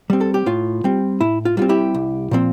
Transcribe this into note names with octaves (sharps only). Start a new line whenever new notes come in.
G3 C4
A4
G4
A2 F4
G3 C4
A2 E4
F4
G3 C4 F4
E4 G4
C2
A#2 F3 C4